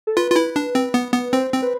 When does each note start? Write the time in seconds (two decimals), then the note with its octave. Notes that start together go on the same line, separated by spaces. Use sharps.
0.07 A4
0.17 F4 B4
0.31 F4
0.36 E4
0.56 D4
0.75 C4
0.94 B3
1.14 B3
1.33 C4 C5
1.53 C4
1.62 B4